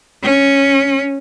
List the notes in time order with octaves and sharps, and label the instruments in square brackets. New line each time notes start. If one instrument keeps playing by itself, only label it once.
[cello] C#4